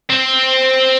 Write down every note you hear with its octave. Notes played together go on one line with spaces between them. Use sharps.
C4